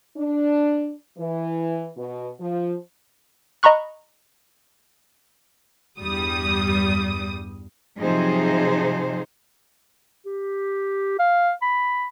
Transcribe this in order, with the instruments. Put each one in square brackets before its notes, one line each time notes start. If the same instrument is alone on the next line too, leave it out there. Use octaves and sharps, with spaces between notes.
[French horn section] D4
E3
B2
F3
[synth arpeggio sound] D#5 A#5 B5 C#6 F#6
[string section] E2 G2 G3 D#6
[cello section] C3 F3 F#3 D#4 G#4 C5
[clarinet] G4
F5
B5